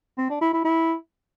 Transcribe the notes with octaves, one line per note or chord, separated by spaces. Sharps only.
C4
D4
E4
E4
E4